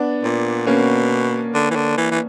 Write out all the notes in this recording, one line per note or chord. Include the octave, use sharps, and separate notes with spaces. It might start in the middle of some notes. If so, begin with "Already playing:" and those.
Already playing: B3 D4
A#2
B2 A#3 C#4
D3
E3
D3
E3
E3